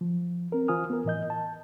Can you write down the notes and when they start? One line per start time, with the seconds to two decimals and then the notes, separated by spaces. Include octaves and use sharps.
0.01 F3
0.52 C4 A#4
0.68 E3 F4 C5 G#5 D#6 F6
0.90 B3 A#4
1.05 A2 E3 D#5 G6
1.30 A5